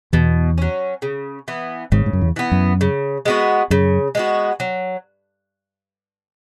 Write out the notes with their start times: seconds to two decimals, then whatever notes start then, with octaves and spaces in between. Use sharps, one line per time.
0.13 E2 B2 E3
0.58 F#3 C#4
1.02 C#3
1.48 E3 B3
1.92 G#1 G#2 C#3
2.06 G#2
2.13 F#2
2.21 E2
2.36 E3 B3
2.52 F#2
2.81 C#3
3.25 G#3 B3 F#4
3.70 F#2 C#3
4.15 G#3 B3 F#4
4.60 F#3